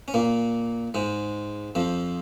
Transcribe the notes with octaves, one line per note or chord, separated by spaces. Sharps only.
C#4
A#2 A#3
G#2 G#3
F2 F3